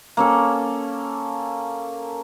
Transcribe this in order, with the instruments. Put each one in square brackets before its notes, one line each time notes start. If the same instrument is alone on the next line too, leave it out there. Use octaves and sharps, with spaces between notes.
[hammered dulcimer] A#3 C#4 A4